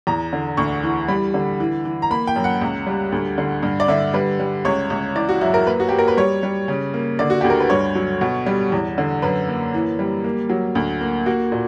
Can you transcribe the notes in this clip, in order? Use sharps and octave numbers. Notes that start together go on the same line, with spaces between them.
E2 A#5
D3
D2 C#6
E3
G3 B5
D3
E3
E3
A#5
A#3 B5
G5
F#2
F#5
C#2
G3
D2
D3
G2
D5
D3 E5
G3 B4
G3
C#2 C#5
C#2
E3 D5
F#4
F#2 E4
A#4
A#3 B4
F#4
A#3 G4
A#4
B4
G3 C#5
G3
C#3
A#3
D3 D5
F#4
D2 G4
A#4
B4
G2 C#5
F#3
B2
G3
E2
D3
F#2 B4
A#3
E3
G3
A#3
F#3
D2
A#3
A#3 F#4
A#2